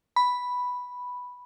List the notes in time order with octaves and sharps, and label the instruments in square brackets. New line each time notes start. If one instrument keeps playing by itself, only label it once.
[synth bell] B5